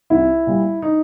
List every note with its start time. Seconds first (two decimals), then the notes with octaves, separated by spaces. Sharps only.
0.10 C2 E4
0.47 A#2 G3
0.82 D#4